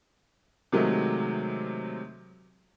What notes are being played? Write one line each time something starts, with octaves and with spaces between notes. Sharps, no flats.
C3 D#3 F#3 G#3 A3